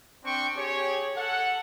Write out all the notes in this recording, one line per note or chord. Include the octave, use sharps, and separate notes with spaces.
C4 D4 G5 C#6
G4 G#4 C#5
A4 F#5